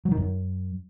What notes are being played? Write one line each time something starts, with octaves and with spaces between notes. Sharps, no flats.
F#3
D#3
F#2